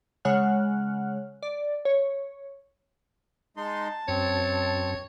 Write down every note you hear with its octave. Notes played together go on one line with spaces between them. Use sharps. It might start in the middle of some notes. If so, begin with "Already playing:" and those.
C#3 G#3 C#5 F#5 F6 F#6
D5
C#5
G#3 D#4 A5 C6
F#2 C4 C#5